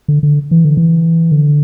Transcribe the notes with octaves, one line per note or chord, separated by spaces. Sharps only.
D3
D3
E3
D3
E3
D3